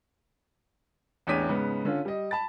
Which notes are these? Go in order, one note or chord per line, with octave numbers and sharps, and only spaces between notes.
A1 E2 D4 C#5 B6 D#7
G#2 C#3 B3
D3 C#4 F4
G3 D#5
A5 B5 A6